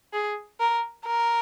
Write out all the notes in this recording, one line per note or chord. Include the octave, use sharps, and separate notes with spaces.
G#4
A#4
A#4